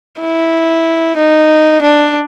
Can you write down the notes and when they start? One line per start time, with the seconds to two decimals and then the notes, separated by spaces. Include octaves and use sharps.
0.20 E4
1.17 D#4
1.81 D4